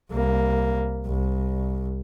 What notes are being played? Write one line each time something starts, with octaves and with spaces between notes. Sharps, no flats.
C2 A#3
C2